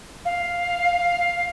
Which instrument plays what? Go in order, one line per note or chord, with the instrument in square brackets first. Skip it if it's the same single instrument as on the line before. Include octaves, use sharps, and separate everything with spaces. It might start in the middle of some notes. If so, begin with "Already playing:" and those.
[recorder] F5